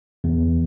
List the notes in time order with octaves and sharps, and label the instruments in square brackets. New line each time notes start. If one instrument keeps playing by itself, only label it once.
[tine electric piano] E2